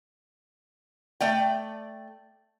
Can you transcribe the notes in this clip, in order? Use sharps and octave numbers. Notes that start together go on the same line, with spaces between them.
A3 D5 G5